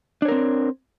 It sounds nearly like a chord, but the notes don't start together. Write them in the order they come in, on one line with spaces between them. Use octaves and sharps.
D4 C#5 A#4 C4